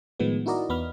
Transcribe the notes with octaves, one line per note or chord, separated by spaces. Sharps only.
A2 D#3 F3 G#3 B3
D#4 E4 F#4 A#4 D5 D#5
E2 B3 B5 F6